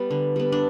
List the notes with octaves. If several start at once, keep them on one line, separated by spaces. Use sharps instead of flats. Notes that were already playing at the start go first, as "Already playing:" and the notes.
Already playing: G3 B3
D3
G3 B3
D4